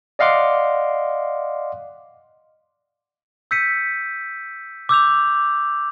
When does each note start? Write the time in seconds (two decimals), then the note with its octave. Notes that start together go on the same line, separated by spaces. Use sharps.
0.19 D5 D#5 F5 F#5 C6 D6
3.51 E6 G6 B6 C#7 D#7
4.89 D6 E6 G6 F7